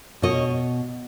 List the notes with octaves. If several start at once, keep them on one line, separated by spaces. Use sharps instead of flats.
B2 C#5 D#5